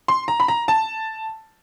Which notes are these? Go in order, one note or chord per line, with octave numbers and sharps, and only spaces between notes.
C6
A#5
B5
A#5
A5